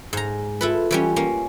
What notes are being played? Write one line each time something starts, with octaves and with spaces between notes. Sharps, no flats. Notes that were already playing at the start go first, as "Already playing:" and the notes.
G#2 A#5
E4 F4 A4 B4
E3 G3 C#4
A#3 C#4